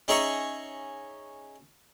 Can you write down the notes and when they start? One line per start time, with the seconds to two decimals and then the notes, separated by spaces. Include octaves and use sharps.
0.08 C#4 D#4 G#4 E5 A#5 C#6